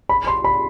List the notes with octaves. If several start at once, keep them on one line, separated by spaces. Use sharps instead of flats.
B5
C6
B5